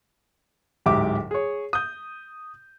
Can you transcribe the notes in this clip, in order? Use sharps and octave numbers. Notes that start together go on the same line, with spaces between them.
D1 G#2 G4 E5 D6
G#4 C#5
D#6 G6